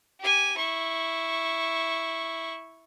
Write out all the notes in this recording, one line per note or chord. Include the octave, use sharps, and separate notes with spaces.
G4 G#5
E4 C#6